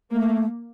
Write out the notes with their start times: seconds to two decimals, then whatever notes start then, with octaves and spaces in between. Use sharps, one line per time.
0.11 A3 A#3